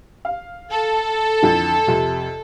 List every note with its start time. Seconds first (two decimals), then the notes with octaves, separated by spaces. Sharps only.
0.25 F5
0.70 A4
1.42 F2 D3 E3
1.87 F2 C3